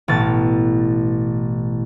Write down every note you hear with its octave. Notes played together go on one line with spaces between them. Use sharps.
A1 B2 A6